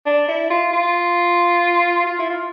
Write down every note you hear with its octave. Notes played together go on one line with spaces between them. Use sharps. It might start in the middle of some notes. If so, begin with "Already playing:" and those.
D4
E4
F4
F4
F4
E4
F4